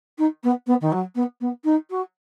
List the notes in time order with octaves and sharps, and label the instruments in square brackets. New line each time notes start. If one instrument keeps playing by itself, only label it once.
[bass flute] D#4
B3
B3
D#3
F#3
B3
B3
D#4
F#4